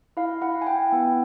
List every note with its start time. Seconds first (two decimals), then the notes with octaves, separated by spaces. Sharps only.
0.17 E4 F5
0.41 E4 F#5
0.62 G#5
0.67 E4 G5
0.92 B3